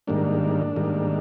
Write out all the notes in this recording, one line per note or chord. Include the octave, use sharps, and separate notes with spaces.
G#2 D#3 G3 A#3 D4
G#2 D#3 G3 A#3